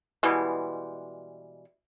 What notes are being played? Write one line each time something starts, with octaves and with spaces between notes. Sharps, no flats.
B2 E3 G3 G#3